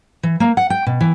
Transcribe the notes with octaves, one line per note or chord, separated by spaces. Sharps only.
E3
A#3
F#5
G5
B2
E3